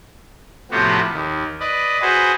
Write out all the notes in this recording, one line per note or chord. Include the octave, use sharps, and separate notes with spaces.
A2 C3 F3 B3 F#4 G4
D#2
B4 D5 D#5
F#4 G#4 B4 C5